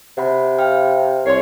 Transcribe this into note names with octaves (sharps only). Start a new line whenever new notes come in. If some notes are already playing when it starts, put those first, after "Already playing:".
C3 F#5 B5
F5 G5 F6
C2 C#5 C6 C7